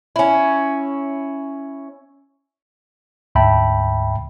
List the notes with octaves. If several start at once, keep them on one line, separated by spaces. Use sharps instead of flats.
C#4 E4
D2 G#2 E5 G5 A5 B5